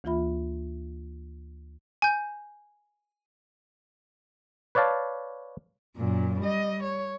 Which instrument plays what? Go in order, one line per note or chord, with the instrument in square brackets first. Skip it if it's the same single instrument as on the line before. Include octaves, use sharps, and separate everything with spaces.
[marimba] D2 E3 A#3 F4 E5 B5
[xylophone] G#5 G6
[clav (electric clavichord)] B4 C#5 D5 F5 A5
[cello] F#2 A#2
G3 D#5
C#5